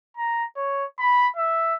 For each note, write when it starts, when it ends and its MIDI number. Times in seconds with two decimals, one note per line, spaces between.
0.17 0.44 82
0.57 0.85 73
0.99 1.28 83
1.36 1.75 76